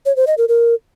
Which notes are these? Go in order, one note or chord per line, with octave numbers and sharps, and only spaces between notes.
C#5
C5
D#5
A#4
A#4